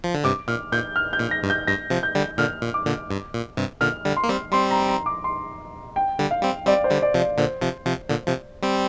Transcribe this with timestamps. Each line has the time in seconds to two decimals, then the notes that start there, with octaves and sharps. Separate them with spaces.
0.04 F3
0.14 D3
0.24 G2 C3 D6
0.48 A#2 F6
0.72 A#2 G6
0.96 F6
1.13 G6
1.19 A#2
1.31 A#6
1.43 G2
1.50 G6
1.67 G2 A#6
1.90 C3 F3
2.03 G6
2.15 D3 G3
2.38 A#2 D3 F6
2.62 A#2
2.74 D6
2.86 A#2 D3
3.11 G2
3.34 A#2
3.57 G2 C3
3.81 A#2 D3 F6
4.05 D3 G3
4.17 C6
4.23 A#3
4.29 G3 C4
4.52 G3 C4 C6
4.71 A#5
4.89 A#5
5.06 D6
5.24 C6
5.96 G5
6.19 D3 G3
6.31 F5
6.42 G3 C4
6.67 G3 C4 D5
6.84 C5
6.91 D3 G3
7.02 D5
7.14 C3 F3
7.21 D5
7.38 A#2 D3 C5
7.61 C3 F3
7.86 C3 F3
8.09 A#2 D3
8.27 C3 F3
8.63 G3 C4